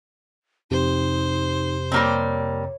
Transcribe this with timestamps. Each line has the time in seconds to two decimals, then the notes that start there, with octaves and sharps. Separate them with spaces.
0.71 F2 C3 D#4 G4 C5
1.92 G3 A#3 C4 C#5